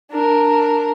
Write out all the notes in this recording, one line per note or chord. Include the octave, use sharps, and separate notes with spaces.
D4 A#4